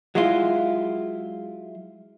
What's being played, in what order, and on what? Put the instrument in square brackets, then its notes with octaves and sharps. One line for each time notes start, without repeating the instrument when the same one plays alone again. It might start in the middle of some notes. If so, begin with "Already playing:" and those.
[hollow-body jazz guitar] F#3 G#3 E4 F4